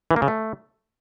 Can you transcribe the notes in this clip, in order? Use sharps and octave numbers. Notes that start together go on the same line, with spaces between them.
E3
A#3
C#3
A3